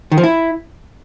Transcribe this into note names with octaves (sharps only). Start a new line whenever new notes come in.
D#3
F3
E4